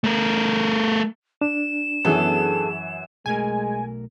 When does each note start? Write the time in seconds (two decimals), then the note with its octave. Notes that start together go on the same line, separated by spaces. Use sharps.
0.04 A3 A#4
1.41 D4 E7
2.05 F#2 E3 B3 G#4 A4
3.26 B1 G#3 A3 A#4 G#5